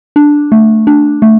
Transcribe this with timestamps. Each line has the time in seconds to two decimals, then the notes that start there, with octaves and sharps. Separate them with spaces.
0.16 D4
0.52 A3
0.87 D4
1.22 A3